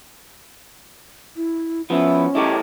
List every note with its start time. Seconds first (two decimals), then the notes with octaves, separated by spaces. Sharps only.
1.36 E4
1.90 F3 B3 C#4 E4
2.35 E4 G4 A4 A#4 C#5 D#5